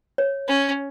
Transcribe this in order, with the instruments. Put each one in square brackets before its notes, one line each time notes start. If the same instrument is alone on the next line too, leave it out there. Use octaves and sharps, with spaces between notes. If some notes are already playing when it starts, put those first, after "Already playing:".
[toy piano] C#5
[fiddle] C#4